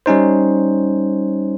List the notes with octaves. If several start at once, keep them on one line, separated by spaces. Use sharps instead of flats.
G3 C#4 D#4 C5